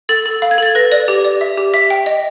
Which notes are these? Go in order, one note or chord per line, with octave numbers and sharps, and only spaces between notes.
A4 A6
A4
F5
G#6
A4 A6
B4 A#6
D5
G4
D5
E5
G4
E5 B6
G5
D#5